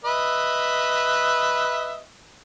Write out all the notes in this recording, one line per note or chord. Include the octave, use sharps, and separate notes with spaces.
B4 D#5 E5